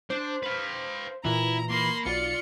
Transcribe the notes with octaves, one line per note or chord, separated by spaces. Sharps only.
D4 C5
B4 F5
A#2 E3 E4 A#5
A#3 B5 C6
B1 F4 D5 C#7